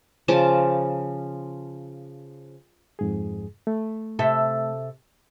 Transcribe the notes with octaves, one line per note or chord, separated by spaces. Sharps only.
C#3 F3 A5 D6
F2 G#2 G#4
A3
C3 A4 E5